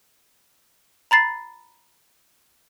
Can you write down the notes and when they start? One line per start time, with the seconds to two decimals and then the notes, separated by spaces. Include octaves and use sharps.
1.11 A#5 B5 A6 C7